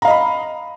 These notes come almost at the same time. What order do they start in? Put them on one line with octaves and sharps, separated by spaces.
A#5 F5 D#5 B5